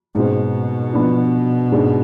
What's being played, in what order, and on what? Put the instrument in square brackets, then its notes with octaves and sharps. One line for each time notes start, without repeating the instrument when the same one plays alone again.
[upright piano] G#2 G#3 C4 [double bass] B2
[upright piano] F3 B3 D4
G#2 G#3 D4